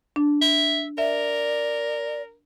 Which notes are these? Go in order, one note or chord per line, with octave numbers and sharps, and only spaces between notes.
D4
E5
A#4 D5 E5